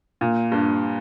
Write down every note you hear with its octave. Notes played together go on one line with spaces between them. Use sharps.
A#2
G2